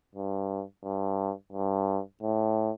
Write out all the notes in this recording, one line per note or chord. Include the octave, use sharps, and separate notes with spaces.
G2
G2
G2
A2